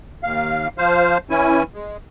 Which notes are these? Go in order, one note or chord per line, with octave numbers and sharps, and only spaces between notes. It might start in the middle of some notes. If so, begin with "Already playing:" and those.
D#2 F5
F3 C5 F5
E3 C#4 E4 G#5
G#3